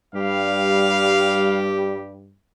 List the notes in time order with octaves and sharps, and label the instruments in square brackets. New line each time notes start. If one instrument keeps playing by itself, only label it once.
[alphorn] G2 [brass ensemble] G3 [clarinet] G4 [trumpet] F5